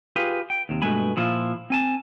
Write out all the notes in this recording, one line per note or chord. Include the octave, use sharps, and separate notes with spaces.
F4 G4 G#4 B4
G5
D#2 C3
G2 B2 G#3 A3 G#5 B5
A#2 F3 E4 F4
C4 G#5 A5